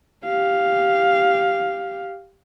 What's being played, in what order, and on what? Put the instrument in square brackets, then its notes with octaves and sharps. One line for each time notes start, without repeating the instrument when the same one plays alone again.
[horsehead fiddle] G4 F5